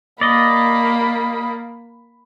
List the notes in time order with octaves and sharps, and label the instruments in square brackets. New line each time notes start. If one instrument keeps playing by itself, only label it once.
[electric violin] A#3 [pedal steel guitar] D5 D#5 [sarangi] B5